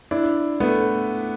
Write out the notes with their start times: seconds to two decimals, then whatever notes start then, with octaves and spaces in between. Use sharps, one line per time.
0.11 D4 E4
0.60 A3 B3